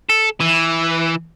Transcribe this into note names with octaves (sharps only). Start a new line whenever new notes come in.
A4
E3